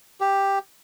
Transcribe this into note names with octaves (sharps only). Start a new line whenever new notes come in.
G4